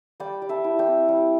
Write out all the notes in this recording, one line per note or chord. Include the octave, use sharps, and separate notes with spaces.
G3 D5 G5
G3
E5 A5
E4
D5 G5
C4
G3